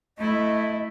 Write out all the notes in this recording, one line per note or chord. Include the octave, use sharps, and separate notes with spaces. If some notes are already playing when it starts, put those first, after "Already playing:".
A3 E4 D#5